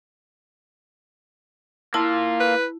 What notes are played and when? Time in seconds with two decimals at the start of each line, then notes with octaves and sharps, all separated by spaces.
1.94 A#3 E4 F4 A5
2.40 B4